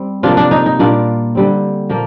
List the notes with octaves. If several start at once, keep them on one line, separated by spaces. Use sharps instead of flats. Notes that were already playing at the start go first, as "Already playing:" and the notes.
Already playing: G3 C4
C3 F3 A#3 D4 F4
D4
D#4
D#4
A#2 G3 A#3 D4 F4
D3 G3 C4
A#2 F3 A#3